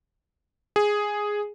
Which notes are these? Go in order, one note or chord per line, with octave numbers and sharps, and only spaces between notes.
G#4